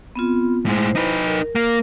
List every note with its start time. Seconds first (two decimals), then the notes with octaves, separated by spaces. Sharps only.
0.16 B3 C4 F4
0.66 A2 G#3 E4 C5
0.95 D#4 B4
1.26 A#4
1.55 A#3 A#4